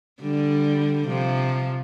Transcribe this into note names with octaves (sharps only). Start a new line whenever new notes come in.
D3 G3
C3 F3